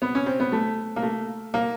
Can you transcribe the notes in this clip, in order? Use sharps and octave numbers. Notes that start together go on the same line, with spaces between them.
B3
C#4
C4
B3
A3
A#3
A3
A#3